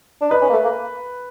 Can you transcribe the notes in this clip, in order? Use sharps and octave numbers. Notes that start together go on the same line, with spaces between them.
D4
D#4 B4
C#4
A#3
A3
A#3